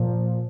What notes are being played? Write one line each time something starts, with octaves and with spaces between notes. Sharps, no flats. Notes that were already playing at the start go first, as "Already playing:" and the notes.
Already playing: A#2 F3